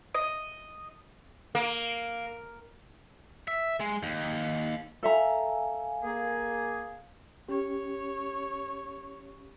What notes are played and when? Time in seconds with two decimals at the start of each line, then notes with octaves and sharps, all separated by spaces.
0.15 D#5
1.55 A#3
3.48 E5
3.80 G#3
4.03 D#2
5.03 A4 E5 F5 G#5 A#5
6.03 A#3 G#4
7.48 C#4 G4 C#5